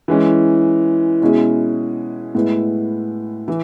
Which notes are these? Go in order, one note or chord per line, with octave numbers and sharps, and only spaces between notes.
E3 G#3 C#4
B2 G#3 C#4 E4 G#4
A2 G#3 B3 E4
E3